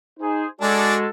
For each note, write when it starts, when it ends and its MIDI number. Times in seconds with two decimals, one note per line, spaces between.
0.20 0.46 63
0.20 0.46 68
0.20 0.46 72
0.61 1.07 56
0.61 0.95 62
0.61 1.08 66
0.61 0.95 68
0.61 1.08 69
0.61 0.95 74